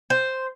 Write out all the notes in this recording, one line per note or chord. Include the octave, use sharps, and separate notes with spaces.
C5